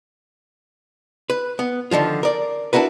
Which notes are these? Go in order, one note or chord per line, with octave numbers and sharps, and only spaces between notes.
B4
B3
D3 D#3 F3 F4
A#4 D5
D4 E4 F#4 A#4 B4